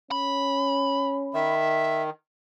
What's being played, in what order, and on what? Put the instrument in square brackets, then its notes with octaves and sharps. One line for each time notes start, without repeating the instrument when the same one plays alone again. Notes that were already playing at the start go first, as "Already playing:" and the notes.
[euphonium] C#4 [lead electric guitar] B5
[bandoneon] D#3 [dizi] E5